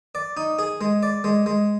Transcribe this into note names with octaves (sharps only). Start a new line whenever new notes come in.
D5
D#4
G#4
G#3
D5
G#3
G#3